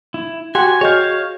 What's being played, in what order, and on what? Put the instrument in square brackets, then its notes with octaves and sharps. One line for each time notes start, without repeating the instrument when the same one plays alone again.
[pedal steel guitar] E4
[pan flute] F#4 [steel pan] G4 F#5 [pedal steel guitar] G#5 [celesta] C6
[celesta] G#4 D#5 G6 [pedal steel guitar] C#5 F5